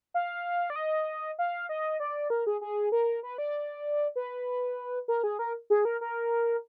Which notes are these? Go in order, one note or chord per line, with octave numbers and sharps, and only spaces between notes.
F5
D5
D#5
F5
D#5
D5
A#4
G#4
G#4
A#4
B4
D5
B4
A#4
G#4
A#4
G#4
A#4
A#4